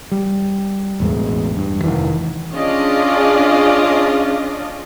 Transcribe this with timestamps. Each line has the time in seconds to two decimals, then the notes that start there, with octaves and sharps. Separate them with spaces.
0.12 G3
1.00 A1 E2 B2 G#3
1.57 G2
1.84 F1 B1 D#3 E3
2.54 C#4 D4 F4 G#4 D5 D#5